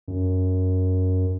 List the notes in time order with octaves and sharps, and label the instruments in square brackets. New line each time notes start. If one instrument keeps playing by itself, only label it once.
[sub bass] F#2